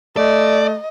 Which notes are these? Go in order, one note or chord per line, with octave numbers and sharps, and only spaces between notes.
A3 D5 D#5